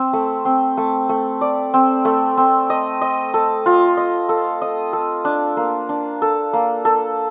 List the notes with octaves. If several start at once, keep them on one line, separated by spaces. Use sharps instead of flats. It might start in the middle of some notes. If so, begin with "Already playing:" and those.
Already playing: C4
A3
C4
A3
A3
D5
C4
A3
C4
D#5
D#5
A4
F4
D#5
A4
D#5
A4
D4
A#3
D4
A4
A#3
A4